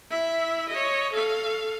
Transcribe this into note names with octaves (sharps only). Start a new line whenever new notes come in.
E4 E5
C#5 D#5
A4 F5